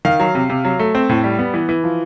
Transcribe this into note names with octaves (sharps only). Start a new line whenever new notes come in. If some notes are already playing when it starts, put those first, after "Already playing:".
D#3 F5
F#3
C3
C3
F#3
A3
C4
A2
G3
B3
E3
E3
F3